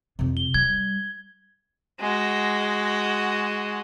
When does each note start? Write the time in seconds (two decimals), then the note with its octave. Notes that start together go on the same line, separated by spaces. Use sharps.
0.19 F2 C3
0.37 G7
0.54 G3 G#6
2.01 G#3 F#4